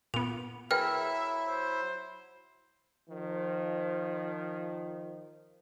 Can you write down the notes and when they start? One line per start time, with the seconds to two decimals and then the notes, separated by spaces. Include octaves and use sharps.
0.14 A#2 B3 F7
0.71 F#3 E4 G#4 A#4 B4 E5 G5 F6
1.47 C5
3.09 D#3 F3